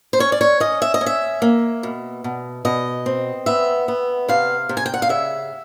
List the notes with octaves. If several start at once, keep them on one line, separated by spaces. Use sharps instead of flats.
C5
C#4 C#5
D5
C#5
C#4 D#5
E5
D#5
C#4
E5
A#3
B2
B2
B2 D#5
C4
B3 E5
B3
C3 F5
C3
G#5
G5
F#5
F5
C#3 E5